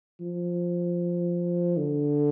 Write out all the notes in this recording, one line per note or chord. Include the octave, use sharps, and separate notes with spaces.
F3
D3